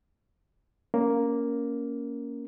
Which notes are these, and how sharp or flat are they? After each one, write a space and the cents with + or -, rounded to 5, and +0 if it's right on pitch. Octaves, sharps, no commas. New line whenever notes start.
A#3 +0 C#4 +10